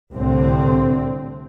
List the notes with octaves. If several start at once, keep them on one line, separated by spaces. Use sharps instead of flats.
C2 A2 D3 C4